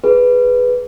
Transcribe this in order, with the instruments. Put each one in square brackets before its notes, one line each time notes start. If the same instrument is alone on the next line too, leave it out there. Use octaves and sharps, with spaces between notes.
[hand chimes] G#4 B4